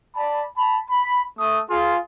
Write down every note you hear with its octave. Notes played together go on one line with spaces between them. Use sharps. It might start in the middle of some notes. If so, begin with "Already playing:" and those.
D5 A5 B5
A5 B5
B5
A3 D#6
F4 G#4